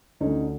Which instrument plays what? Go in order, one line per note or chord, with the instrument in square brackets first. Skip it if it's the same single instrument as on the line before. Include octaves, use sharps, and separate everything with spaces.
[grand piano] D2 D3 C#4 D#4